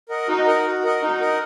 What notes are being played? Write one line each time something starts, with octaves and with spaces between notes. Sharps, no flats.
A#4 D#5 F#5
D#4 F#4
A#4 D#5 F#5
F#4
A#4 D#5 F#5
D#4 F#4
A#4 D#5 F#5